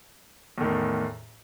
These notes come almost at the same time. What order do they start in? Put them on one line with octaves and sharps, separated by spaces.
E2 D#3 A2